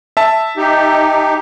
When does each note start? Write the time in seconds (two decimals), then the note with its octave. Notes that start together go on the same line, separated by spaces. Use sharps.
0.17 E5 A5
0.57 D#4 G4